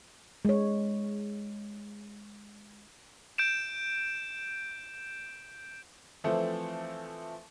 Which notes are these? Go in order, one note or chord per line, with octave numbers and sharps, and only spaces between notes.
G#3 C#5
G6 D7 E7
E3 F3 A3 C4 A4